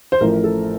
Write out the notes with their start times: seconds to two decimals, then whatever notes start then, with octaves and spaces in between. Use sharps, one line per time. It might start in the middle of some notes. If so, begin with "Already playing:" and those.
0.12 C5
0.21 A1 A2 F3 A#4
0.44 A4